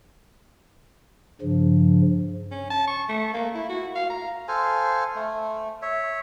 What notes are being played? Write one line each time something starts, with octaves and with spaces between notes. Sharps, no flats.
G2 C#3 F3
C#4
A5
C#6
A3
A#3
E4
F#4
F5
A#5
A4 C5 F5 G#5
A3
C#5 E5